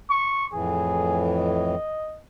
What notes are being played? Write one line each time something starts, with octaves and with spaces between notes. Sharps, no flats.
C#6
F2 A2 E3 G#4
D#5